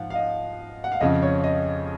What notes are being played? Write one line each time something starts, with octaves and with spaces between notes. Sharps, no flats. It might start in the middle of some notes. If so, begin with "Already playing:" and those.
Already playing: G#2 F3 F5 F#5
F5
D#5
F#5
F5
F2 C#3 F3 D#5
C#5
D#5